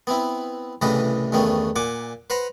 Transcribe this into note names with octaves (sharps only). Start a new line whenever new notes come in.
B3 C4 E4
C2 A2 C#3 E3 B4 D#5
E2 G2 D#3 A3 B3 C#4
A#2 F#5 G#5 D6
B4 C5 F#5 A#5